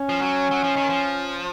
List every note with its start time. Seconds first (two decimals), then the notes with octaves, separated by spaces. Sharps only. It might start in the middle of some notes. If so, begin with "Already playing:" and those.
Already playing: C#4
0.09 F3
0.22 F#3
0.51 F#3
0.64 F3
0.77 D#3
0.89 F3